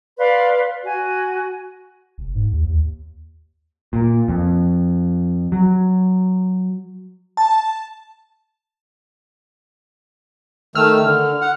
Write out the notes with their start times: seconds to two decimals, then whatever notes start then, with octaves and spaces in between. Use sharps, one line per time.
0.19 B4 D5 F5 C6
0.84 F#4 G#5
2.18 F1
2.35 G#2
2.51 D#2
2.65 D#2
3.93 A#2
4.28 F2
5.52 F#3
7.37 A5
10.75 D#3 A3 E6 F6
11.03 D3
11.41 F#5